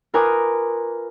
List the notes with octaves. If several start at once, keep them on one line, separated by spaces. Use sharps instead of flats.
F4 A#4 B4 G#5 D6 D#6